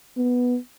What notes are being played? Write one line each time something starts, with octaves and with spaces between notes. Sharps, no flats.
B3